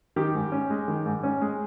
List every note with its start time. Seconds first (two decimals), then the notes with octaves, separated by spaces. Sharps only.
0.16 D#3 G4
0.35 G#2
0.52 C#4
0.70 G#3
0.88 D#3
1.06 G#2
1.23 C#4
1.41 G#3